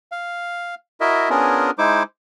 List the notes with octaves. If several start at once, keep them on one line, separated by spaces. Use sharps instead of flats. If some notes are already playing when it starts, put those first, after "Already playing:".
F5
E4 F#4 A#4 D#5 E5
B3 C#4 D4 F4 G#4 A#4
G#3 D#4 E4 C5 D6